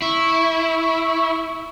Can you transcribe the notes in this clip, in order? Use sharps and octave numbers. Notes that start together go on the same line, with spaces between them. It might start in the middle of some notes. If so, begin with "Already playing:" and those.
E4 C#6